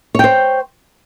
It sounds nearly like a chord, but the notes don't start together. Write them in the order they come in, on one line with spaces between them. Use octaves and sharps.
C#5 G5 C5